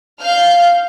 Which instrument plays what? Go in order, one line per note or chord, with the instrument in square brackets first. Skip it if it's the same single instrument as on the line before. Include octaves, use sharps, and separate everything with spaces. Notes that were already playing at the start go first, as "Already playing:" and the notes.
[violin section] F5 F6 G6